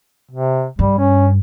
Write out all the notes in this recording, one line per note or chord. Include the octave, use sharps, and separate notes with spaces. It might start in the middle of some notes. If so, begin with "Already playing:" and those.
C3
G2 G3
C#4